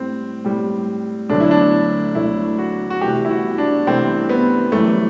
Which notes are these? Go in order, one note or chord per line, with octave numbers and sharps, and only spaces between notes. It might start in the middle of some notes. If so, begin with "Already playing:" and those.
Already playing: A2 G3 C4
A2 G3
D2 D3 F#3 A3 D4
E4
D4
D2 D3 F#3 A3 E4
F#4
F#4
C2 C3 E3 A3 G4
E4
F#4
D4
C2 C3 E3 A3 C4
B3
F#2 E3 G3 A3